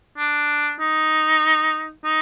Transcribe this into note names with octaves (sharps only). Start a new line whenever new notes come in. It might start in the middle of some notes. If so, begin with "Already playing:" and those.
D4
D#4
D#4